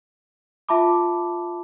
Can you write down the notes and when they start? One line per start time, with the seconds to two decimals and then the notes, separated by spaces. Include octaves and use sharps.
0.69 F4 E5 A5 B5 D6